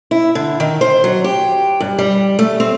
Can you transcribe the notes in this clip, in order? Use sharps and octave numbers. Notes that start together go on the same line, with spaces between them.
E4
D3
D#3
C5
F#3
G4
G2
G3
A3
C4